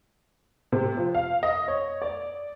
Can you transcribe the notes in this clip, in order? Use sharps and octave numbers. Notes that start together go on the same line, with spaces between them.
C3
F3
F5
D#5
C#5
D5